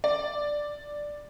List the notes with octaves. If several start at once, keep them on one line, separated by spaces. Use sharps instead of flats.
D5